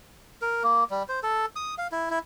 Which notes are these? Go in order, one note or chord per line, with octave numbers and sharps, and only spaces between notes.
A#4
A#3
G3
C5
A4
D#6
F5
E4
E4